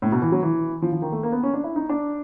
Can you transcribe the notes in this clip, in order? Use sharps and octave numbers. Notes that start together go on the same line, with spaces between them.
A2
B2
E3
F#3
E3
F3
F3
D#3
A3
A#3
B3
C#4
D4
E4
D#4
D4